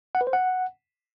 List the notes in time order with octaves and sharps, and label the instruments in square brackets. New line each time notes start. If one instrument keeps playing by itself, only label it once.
[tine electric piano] F#5
B4
C5
F#5